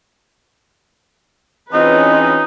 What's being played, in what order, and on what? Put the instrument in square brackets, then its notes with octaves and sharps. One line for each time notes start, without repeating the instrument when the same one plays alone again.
[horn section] E3 C4 G#4 [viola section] C#4 F4 B4 [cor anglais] D#4 [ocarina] D#5